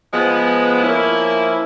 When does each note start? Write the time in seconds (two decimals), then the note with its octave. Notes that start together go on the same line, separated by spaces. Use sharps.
0.10 F3 G#3 B3
0.82 F3 A#3 C#4 E4